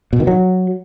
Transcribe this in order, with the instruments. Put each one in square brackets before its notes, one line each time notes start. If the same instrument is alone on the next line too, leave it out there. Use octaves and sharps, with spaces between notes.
[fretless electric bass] B2
D#3
F#3